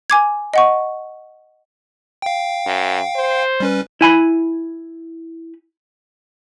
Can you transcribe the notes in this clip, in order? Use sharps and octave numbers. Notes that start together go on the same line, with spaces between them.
G#5 D6 G#6
D#5 F#5 C#6
F5 G5
F#2
C5
G3 C#4 B4
E4 G#5 B5